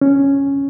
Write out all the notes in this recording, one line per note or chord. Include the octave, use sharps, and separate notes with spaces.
C#4